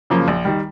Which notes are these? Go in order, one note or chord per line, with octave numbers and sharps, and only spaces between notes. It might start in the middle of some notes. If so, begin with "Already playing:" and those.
F#2 C#3 F3 A#3
A#1
D#3 G3